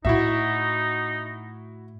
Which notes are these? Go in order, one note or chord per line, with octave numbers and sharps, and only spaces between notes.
A2 D#4 E4 F#4 E5